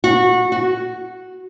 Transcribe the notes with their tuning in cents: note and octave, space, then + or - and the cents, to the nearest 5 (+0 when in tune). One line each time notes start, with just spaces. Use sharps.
F#4 -20
F#4 +0